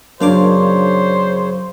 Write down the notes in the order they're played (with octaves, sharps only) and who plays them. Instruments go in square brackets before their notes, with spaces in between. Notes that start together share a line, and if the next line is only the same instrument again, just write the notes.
[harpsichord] F#2 F5 D6 [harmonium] C#3 C#5 [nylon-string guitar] A#3 D4 [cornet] C5